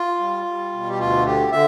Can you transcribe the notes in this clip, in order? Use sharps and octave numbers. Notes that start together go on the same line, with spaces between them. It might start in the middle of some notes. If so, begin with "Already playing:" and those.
Already playing: F4
G3
G3
B2
G4
D2 F4
D3 G4
D3 E5